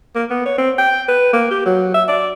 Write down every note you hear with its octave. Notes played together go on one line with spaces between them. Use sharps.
A#3
B3
C#5
C4
G5
B4
A#3
G4
F#3
E5
D5